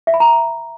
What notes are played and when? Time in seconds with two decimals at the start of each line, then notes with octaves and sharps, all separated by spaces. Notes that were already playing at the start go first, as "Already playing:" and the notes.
0.07 E5
0.14 B5
0.20 A#5